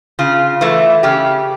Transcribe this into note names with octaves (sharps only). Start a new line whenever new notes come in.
C#3 F4
E3 A3
C#3 G4